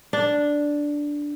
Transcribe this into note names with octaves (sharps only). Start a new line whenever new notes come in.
D4